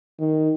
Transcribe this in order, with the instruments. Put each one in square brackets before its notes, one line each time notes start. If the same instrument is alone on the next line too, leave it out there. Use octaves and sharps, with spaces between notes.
[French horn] D#3